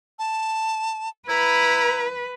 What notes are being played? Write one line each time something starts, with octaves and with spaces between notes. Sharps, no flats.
A5
E4 B4 A#5